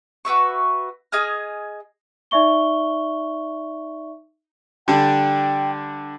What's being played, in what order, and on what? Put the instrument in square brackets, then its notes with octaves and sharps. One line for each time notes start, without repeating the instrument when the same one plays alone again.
[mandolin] F#4 B4 E5 C#6
G#4 D#5 G#5 F6
[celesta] D#4 D5 E5 C#6 G7
[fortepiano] D3 G3 D4 [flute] G5